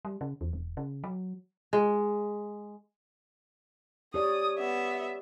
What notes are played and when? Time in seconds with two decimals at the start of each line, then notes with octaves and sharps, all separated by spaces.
0.05 G3
0.21 C#3
0.41 E2
0.53 E1
0.77 C#3
1.04 F#3
1.73 G#3
4.14 G4 C#5 D5 D#6
4.59 B3 E5